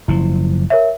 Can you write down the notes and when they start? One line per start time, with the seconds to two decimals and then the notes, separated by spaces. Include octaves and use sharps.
0.08 F#1 F3 E4
0.70 A#4 C#5 E5